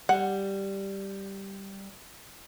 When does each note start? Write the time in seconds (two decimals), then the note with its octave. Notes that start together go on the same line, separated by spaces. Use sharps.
0.09 G3 F#5